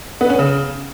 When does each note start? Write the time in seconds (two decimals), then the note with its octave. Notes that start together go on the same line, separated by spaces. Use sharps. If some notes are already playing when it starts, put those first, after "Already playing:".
0.21 B3
0.30 C#4
0.39 C#3